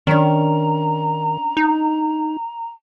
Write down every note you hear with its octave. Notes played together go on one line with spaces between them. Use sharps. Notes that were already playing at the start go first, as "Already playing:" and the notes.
D#3 C#4 D4 A#5
D#4